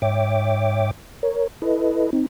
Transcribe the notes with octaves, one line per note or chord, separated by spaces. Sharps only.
G#2 C#5 E5 G5 D6
A#4 C#5
E4 A4 B4 D#5
C4 D#4